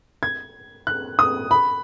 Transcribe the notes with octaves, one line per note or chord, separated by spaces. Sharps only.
G#6
F#6
D#6
B5